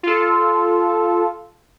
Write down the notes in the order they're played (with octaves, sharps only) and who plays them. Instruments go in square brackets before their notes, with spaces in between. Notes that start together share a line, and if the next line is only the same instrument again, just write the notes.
[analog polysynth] F4 A4